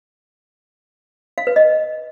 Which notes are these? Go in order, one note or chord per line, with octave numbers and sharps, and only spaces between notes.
F5
B4
D#5